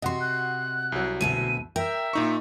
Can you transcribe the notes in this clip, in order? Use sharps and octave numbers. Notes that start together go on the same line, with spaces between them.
C3 F#4 D#5 F#5 C6
F#6
C2 F#3
D2 B2 E5 D#7
A#4 E5 G5
A#2 D#4 C#6